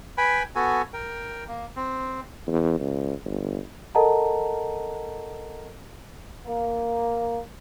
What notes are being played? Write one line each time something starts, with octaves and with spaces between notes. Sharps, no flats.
B4 G5 G#5 B5
B3 F#4 A4 G#5
A#4 G5
A#3
C4
E2
C#2
G1
A4 A#4 D#5 F#5 A5 A#5
A#3